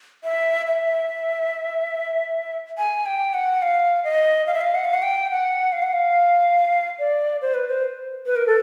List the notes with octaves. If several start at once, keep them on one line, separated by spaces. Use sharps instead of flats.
E5
E5
G#5
G5
F#5
F5
D#5
F5
E5
F5
F#5
F5
F#5
G5
F#5
F5
F#5
F5
D5
C5
B4
C5
B4
A#4
A4